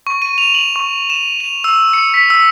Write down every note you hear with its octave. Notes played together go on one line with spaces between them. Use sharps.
C#6
D#7
F7
F#7
C#6
E7
F7
E6
C#7
B6
E6